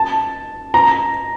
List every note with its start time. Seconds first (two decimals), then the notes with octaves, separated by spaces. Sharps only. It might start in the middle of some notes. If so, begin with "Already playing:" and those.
Already playing: A5
0.74 A#5